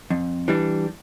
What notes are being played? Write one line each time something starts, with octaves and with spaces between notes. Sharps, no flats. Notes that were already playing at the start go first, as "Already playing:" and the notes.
F2
E3 G3 D4